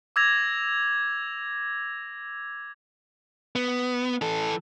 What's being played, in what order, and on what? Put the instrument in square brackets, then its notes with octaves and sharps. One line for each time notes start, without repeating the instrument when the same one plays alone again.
[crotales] D6 E6 G#6 A#6 F7
[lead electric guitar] B3
E3 A4